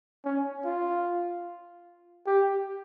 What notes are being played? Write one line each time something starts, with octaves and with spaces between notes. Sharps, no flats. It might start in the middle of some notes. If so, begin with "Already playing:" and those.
C#4
F4
G4